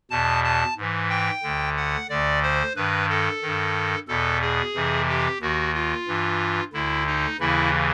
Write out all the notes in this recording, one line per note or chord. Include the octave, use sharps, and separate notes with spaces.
E2 B2 A5
A5
G#2 E3
G5
D2 D3
F#5
D2 D3 D5
C5
G2 D#3 B4
A4
G2 D#3
E2 B2 A4
G#4
F2 C3 E3
G4
D#2 D#3 F#4
F4
G2 E3
D2 D3 E4
D#4
D#2 C#3 E3 E4